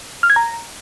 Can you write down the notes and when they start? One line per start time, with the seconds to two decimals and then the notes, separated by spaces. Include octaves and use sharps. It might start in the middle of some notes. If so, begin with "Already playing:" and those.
0.23 F6
0.30 G#6
0.36 A#5